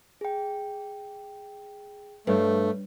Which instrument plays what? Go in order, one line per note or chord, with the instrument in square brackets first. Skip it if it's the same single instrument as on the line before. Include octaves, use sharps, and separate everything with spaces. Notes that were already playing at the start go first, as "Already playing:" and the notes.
[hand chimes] G#4 G5
[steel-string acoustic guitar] G2 [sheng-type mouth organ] A3 [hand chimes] B4 C#5